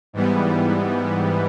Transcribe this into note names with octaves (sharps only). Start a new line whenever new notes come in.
G#2 E3 G3 B3